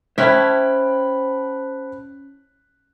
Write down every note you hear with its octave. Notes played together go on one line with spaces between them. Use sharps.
C#4 E4 C5 G5 A5 B5 F#6 B6